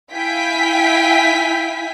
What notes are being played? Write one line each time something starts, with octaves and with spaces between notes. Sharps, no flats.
E4 F5 G5 G#5 B6